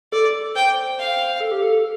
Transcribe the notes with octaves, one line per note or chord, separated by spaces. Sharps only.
A4 D5
C5 G5
F5
A4
G4
A4
A4